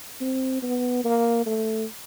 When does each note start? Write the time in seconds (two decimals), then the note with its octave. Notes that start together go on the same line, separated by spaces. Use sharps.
0.21 C4
0.63 B3
1.05 A#3
1.46 A3